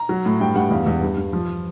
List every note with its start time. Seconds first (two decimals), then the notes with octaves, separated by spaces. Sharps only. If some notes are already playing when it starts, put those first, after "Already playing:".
Already playing: A#5
0.09 F#3
0.26 A2
0.40 G2 G5
0.55 G2 F#5
0.71 E2 F5
0.87 E2
1.02 G2
1.17 G2
1.33 F3